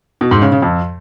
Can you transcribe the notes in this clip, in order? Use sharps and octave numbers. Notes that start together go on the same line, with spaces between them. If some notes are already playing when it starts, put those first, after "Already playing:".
B2
G#2
C#3
C#3
F2